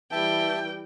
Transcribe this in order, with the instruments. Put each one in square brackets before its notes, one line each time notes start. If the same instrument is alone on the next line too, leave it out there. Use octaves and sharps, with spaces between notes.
[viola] E3 G3 [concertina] E5 A5 [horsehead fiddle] G5